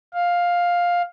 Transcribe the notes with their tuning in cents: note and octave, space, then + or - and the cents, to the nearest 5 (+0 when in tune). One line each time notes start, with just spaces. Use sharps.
F5 +10